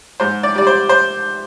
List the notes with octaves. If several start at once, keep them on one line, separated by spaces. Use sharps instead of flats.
G#2 C5
D5
G3 D5
C5
C5